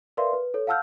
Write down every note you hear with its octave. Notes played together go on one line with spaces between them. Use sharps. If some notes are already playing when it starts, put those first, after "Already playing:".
A#4 B4 D5 E5 F5 C6
B4
A4 C#5
F5 F#5 A5 E6 F6 G6